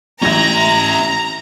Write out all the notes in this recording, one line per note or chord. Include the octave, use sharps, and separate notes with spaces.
A1 C#4 E5 A#5 A#6